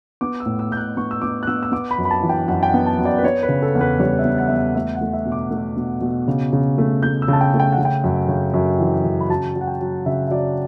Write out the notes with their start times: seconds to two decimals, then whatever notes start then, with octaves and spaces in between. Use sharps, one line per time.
0.21 B3 D6
0.40 E6
0.46 A2
0.59 E6
0.72 A2 G6
0.77 F#6
0.97 B3 C#6
1.11 E6
1.22 B3 D6
1.43 F#6
1.47 B3 E6
1.63 E6
1.72 B3 D6
1.91 B5
1.98 F#2
2.05 B5
2.11 A5
2.23 E3
2.29 G5
2.48 F#2 F#5
2.63 G5
2.68 F#5
2.74 B3
2.86 A5
2.99 F#2
3.05 D5
3.18 B4
3.23 B3 C#5
3.43 B4
3.49 C#3
3.62 A4
3.75 E2
3.81 B4
4.00 G3 C#5
4.19 E5
4.25 B3
4.38 F#5
4.48 E2 E5
4.56 F#5
4.75 A3 E5
4.95 F#5
5.01 A3
5.13 E5
5.26 B2
5.32 D6
5.51 A3
5.76 B2
6.01 B2
6.27 C#3
6.53 C#3
6.78 A3
7.03 A3 G6
7.22 E6
7.28 C#3 A5
7.41 G5
7.54 A3
7.60 G5
7.72 F#5
7.78 C#3
7.85 G5
8.04 F#2
8.28 C#3
8.54 F#2
8.80 E3
9.05 C#3
9.21 B5
9.30 F#3 A5
9.56 F#3
9.61 F#5
9.67 G5
9.81 F#3
10.06 C#3 E5
10.27 E5
10.31 F#3 D5